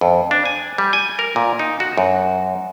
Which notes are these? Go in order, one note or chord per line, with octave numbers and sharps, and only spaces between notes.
F2
D4
G#5
G3
G#5
A#4
A#2
D#4
F#4
F#2